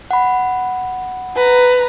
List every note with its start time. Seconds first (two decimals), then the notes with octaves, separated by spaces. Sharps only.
0.11 F#5 B5
1.36 B4 A#5